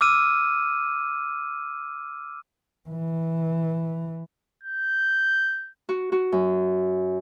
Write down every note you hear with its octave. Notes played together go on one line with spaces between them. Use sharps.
D6 E6 F6 D#7
E3
G6
F#4
F#4
F#2